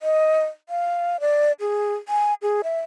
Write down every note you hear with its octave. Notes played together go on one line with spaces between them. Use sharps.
D#5
F5
D5
G#4
G#5
G#4
E5